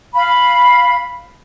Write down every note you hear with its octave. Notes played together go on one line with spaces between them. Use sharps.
F5 B5